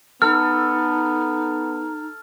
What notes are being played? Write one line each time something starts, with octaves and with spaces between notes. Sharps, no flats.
B3 D#4 A4 F6